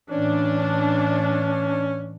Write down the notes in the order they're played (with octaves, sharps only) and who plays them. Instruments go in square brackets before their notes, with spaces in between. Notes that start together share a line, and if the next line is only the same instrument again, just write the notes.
[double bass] A2 E3 [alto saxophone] C#4 [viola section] D4